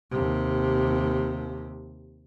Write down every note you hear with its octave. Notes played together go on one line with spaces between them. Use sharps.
D#2 C3